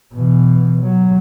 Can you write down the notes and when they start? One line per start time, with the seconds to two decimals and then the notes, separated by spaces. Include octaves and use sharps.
0.14 B2 E3
0.82 F#3